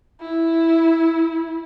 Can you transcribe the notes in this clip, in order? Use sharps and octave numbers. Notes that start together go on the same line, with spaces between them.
E4